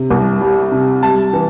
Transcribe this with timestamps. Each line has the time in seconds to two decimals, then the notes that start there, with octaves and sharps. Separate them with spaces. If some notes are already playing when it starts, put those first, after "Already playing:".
Already playing: C3
0.11 C2
0.41 G3
0.72 C3
1.03 G3 A5
1.33 E3